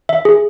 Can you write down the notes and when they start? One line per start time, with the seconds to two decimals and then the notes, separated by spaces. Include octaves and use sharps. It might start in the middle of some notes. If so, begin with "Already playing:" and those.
0.09 E5
0.25 G#4